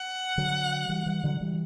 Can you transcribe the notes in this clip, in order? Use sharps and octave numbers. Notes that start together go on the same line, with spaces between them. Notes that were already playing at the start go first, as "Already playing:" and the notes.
Already playing: F#5
D3 F#3
E3 G3
E3 G3
D3 F#3
E3 G3